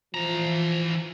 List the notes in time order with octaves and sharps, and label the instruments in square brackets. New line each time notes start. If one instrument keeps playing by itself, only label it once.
[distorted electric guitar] E3 A#5 [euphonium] F3